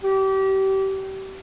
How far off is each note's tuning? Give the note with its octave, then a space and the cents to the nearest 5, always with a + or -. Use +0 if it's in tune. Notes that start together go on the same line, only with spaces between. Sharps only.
G4 -30